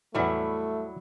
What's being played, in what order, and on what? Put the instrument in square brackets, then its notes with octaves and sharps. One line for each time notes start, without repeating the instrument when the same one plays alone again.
[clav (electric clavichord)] E2 A2 [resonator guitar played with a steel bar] F#3 G3 E4 [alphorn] A3